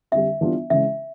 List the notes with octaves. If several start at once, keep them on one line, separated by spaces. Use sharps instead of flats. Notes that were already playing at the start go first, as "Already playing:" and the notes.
F2 D3 G3 E5
E3 G3 B3 D4 F4
C#3 E3 G#3 C#4 E5